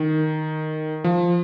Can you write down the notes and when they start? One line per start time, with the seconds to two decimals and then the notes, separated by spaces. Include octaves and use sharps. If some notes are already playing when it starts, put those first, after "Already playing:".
Already playing: D#3
1.04 F3